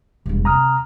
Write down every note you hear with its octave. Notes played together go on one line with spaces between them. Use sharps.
E1 G2
C3 A#5 D#6 F6